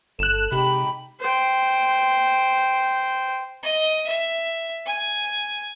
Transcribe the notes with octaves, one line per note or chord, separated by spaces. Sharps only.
G1 A4 F#6 E7
C3 G#3 D#4 G4 B5
C5 G5
D#5
E5
G#5